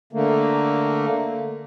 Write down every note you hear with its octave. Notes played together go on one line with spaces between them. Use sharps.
D3 A3 A#3